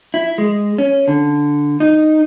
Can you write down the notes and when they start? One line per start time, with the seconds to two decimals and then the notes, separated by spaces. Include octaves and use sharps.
0.14 E4
0.38 G#3
0.78 C#4
1.08 D3
1.80 D#4